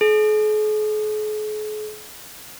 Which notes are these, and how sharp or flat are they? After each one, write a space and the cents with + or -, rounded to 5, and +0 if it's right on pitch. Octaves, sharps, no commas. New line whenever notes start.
G#4 +45